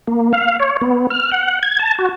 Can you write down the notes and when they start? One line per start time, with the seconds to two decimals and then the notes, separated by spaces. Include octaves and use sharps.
0.07 A#3
0.33 F5
0.60 C#5
0.81 B3
1.10 F6
1.32 F#5
1.63 G#6
1.79 A5
1.99 F#4